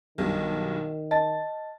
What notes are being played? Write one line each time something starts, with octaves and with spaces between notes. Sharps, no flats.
B1 G2 B2 D#3
D#5 A5 A6